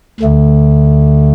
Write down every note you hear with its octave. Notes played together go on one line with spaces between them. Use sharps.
D2 D3 A3